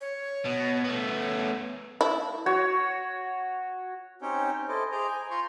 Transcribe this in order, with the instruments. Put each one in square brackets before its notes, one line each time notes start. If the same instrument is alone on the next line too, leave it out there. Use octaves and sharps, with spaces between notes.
[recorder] C#5
[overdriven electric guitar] B2
A3 B3
[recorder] C#5
[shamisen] E4
[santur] F#4 C#5
[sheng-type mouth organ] C4 C#4 D#4 G4 C#5 G5
E4 A4 C5 D#5 D6
G#4 C5 D#5 A#5 D6 G6
G#5
F4 A#5 C6 C#6 G6